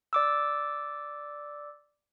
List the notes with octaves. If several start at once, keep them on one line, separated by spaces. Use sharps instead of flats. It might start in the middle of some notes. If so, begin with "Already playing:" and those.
D5 D6 E6